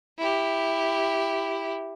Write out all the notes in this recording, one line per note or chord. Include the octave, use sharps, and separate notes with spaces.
E4 G4